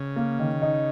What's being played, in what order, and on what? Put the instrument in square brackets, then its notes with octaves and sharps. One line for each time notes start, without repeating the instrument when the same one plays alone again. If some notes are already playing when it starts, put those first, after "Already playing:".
Already playing: [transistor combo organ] C#3
[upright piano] A#3
D#3
D#4